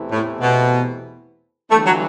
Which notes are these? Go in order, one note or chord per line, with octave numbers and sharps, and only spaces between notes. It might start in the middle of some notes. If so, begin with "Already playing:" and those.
Already playing: E2 C3 E3 A3 E4
A2
B2
G1 G2 E3 A3
F#3